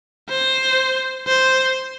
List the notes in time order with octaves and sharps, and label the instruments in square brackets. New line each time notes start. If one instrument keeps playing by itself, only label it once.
[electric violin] C5
C5